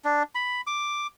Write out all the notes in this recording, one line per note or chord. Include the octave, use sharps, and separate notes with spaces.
D4
B5
D6